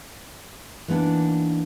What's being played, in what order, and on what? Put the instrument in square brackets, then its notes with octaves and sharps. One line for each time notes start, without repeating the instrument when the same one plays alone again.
[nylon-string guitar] E3 A#3 B3 D4 D#4